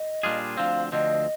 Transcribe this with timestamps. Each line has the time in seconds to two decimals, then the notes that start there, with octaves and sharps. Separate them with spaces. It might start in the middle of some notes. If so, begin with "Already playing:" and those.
Already playing: D#5
0.23 A#2 G3 D4 F4 G#4
0.57 D2 D3 F3 C4 F5
0.92 D2 D3 F3 C4 D#5